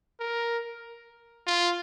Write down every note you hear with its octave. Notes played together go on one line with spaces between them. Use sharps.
A#4
F4